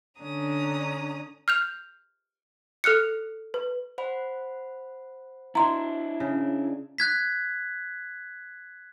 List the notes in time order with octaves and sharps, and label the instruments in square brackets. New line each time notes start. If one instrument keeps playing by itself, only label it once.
[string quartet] D3 C#4 D4 A#5 D#6
[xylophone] F6 G6 F7
A4 F6 F#6 C#7
B4
[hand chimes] C5 F#5 B5
[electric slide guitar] D4 E4 [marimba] A#5 C6
[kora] C#3
[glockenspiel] F#6 G#6 B6